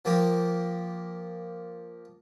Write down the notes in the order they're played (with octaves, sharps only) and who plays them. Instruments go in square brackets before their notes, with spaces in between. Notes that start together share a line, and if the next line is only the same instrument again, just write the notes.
[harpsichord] F3 A#3 G4